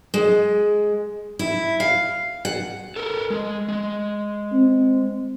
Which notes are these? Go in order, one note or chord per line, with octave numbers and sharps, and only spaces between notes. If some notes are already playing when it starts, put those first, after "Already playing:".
G#3
E4
F5
F#5
A4 A#4
G#3
G#3
C4